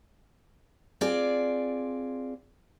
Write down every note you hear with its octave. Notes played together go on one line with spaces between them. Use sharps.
C4 F4 G#4 D5